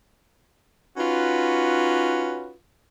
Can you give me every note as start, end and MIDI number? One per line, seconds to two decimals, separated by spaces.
0.97 2.54 61
0.97 2.54 63
0.97 2.54 65
0.97 2.54 66
0.97 2.54 71